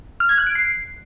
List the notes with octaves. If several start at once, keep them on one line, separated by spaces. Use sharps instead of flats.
F6
G#6
F#6
D7
C7